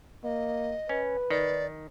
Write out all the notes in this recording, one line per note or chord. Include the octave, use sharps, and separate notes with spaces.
A#3 D#5
C#4 B4
D#3 D5